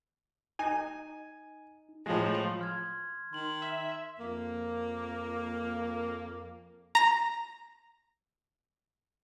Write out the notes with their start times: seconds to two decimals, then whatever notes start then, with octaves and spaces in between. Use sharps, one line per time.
0.59 D#4 G#5
2.06 A2 F3 G#3
2.59 C6 F6 G#6
3.33 D#3 C6 F#7
3.62 E5
4.19 F2 A#3
6.95 A#5 A#6